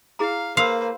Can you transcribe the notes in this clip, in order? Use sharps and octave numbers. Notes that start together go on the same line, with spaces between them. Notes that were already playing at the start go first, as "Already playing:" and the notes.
E4 G#4 F5 A#5
A#3 B4 C5 F5 C6 E6